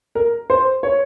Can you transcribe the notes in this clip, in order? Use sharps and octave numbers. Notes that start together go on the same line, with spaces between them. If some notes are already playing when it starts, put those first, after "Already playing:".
A#4
C5
C#5